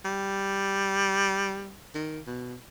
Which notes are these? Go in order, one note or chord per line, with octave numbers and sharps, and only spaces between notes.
G3
D#3
B2